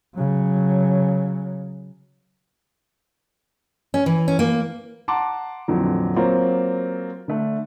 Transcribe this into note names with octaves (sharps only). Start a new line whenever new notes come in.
C#3 F#3
C#4
E3
C#4
A#3
F#5 A5 A#5 C6 D6
F2 A#2 D3 E3 F#3
F#3 A#3 C4 F4 A#4 C#5
D3 A3 D4